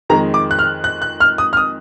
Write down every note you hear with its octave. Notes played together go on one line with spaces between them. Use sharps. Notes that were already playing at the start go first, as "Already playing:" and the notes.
F2 D#3 G#3 A#5
D6
F#6
F6
F#6
F#6
F6
D#6
F6
D#6